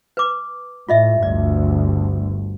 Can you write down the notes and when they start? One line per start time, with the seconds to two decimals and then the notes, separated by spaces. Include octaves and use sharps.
0.17 B4 D6
0.89 A2 F4 D#5 E5
1.23 G1 D2 G2 D5